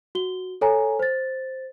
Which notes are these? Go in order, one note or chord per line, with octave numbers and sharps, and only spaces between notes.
F#4 G7
A4 C#5 G#5 A#5
C5 A6